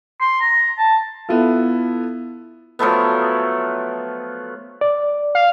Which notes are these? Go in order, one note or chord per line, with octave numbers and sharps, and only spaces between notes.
C6
A#5
A5
B3 E4 F4 A4
F3 F#3 A3 B3
D5
F5